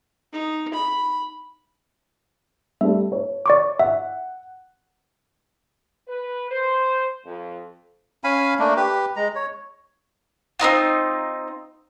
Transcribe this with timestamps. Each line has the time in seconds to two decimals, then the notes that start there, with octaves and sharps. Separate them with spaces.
0.33 D#4
0.74 B5
2.81 G3 A3 A4 E5
3.12 C#5
3.46 D5 C#6 D6
3.79 E5 F#5
6.08 B4
6.50 C5
7.25 F2
8.24 C#4 F5 G#5 B5
8.59 A3 A#3 D4
8.76 G4 B4
9.16 G#3 A#5
9.35 C#5
10.59 C4 C#4 D#4 F4